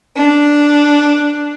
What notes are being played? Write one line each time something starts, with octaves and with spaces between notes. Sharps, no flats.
D4